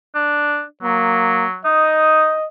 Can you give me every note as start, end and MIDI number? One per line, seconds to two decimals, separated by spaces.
0.15 0.63 62
0.83 1.59 54
0.83 1.45 58
1.65 2.32 63
1.65 2.47 75